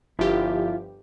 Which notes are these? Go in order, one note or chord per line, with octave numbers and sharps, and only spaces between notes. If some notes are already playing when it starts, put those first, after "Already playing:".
G1 F3 E4 F4 G4